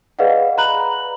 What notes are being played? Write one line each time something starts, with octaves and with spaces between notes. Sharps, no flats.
G#4 B4 D5 D#5 F5 F#5
A#5 B5 F#6 F#7